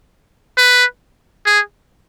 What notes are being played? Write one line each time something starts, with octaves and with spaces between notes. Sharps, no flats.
B4
G#4